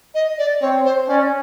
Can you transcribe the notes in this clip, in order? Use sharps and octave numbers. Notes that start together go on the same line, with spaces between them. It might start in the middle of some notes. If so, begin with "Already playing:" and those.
D#5
D5
C4 C#5
C5
C#4 D5